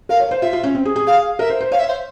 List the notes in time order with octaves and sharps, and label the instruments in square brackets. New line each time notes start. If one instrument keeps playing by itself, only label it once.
[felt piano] A#4 [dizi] F5
[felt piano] C#5
C5
[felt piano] F4 [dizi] E5
[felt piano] F4
C#4
C4
G#4
G#4
[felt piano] G#4 [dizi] F5
[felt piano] A#4 [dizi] E5
[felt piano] C5
C5
[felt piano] C#5 [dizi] F5
[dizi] E5
C5